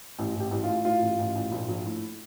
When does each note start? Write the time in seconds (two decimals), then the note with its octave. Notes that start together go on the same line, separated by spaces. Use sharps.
0.19 A1
0.35 A1
0.40 G4
0.51 A1
0.64 F4
0.69 A2
0.85 A2 F4
1.01 A1
1.19 A1
1.36 A1
1.52 A#1
1.69 A#1
1.85 A2